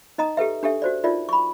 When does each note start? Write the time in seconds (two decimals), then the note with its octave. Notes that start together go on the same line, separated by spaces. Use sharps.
0.18 D#4 D#5 A#5 D#6
0.37 G4 A4 B4 E5
0.63 D4 G4 A4 E5
0.82 F#4 C5 D5
1.04 D#4 F4 A#4 D5 E5
1.29 B5 C#6